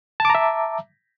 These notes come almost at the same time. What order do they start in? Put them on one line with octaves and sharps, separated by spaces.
A5 D6 A#5 E5